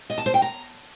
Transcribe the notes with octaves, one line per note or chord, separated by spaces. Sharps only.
D#5
A5
C5
G5
A#5